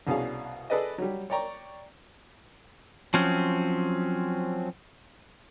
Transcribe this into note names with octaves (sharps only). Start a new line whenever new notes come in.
C2 B2 C#4 D4 G#4 F5
G#4 A4 B4 D5 D#5
F#3 G3
C#5 D5 G5 A#5 C#6
F3 F#3 C4 C#4